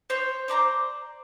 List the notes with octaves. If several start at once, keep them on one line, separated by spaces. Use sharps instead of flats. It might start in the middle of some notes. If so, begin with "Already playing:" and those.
C5 C#5
C5 D5 A5 A#5